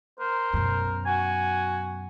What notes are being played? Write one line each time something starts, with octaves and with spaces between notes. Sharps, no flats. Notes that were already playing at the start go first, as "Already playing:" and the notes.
A#4 C5
F#2 B2
F#4 G#5